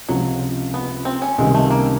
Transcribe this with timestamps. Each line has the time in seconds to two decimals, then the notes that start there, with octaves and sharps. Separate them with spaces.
0.09 C#2 C3 F3 F#3
0.74 B3
1.05 C4
1.22 C#4
1.38 C#2 C3 D#3 G3 G#3
1.54 A3
1.70 A#3